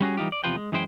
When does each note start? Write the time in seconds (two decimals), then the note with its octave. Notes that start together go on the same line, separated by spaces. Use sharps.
0.01 G3 C#4 F#4 G#4
0.17 E3 G3 D#4 F4 G4
0.32 D5
0.44 E2 C3 F3 F4 B4 G5
0.56 G#3
0.72 F#2 E3 G#3 E4 C5 G5